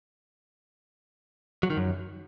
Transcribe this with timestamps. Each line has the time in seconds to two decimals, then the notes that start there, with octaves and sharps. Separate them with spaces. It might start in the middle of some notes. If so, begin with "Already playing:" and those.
1.63 F#3
1.70 D#3
1.77 F#2